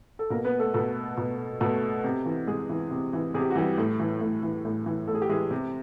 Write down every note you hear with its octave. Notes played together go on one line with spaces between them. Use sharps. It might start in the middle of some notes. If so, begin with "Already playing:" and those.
A4
B2 A#3 A#4
B3 B4
A3 A4
B2 A3 A4
B2
B2 A3 A4
C3
E3
C3 G#3 G#4
E3
C3
E3
C3 G#4
G4
F#4
E3 G3 G4
A2
E3
A2
E3
A2
E3
A2 A4
G#4
G4
E3 G#3 G#4
C3